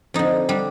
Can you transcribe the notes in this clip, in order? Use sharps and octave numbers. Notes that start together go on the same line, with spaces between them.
F2 D3 D#4
D3 G3